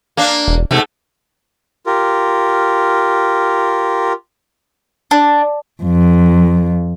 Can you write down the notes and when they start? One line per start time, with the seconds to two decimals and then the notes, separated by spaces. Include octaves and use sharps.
0.17 A#3 D4
0.48 E1
0.71 G#2 C3 A3
1.86 F4 G4 A#4
5.11 D4
5.83 F2